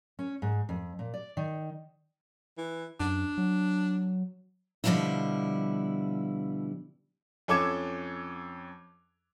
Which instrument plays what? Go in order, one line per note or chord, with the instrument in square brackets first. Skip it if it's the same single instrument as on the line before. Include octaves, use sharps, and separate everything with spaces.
[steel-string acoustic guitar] C#4
G#2
F2
A#2
D5
D#3
[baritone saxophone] E3
[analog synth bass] F#2 [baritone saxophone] D4
[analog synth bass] F#3
[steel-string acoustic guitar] B2 D3 F3 G3 A#3 E4
[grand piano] F2 C#4 A4 D6 G#6 E7